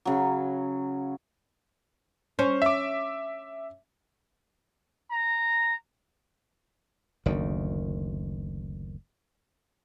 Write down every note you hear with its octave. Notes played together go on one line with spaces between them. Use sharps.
C#3 F#3
C#4 C5
E5 D6
A#5
F#1 D2 D#3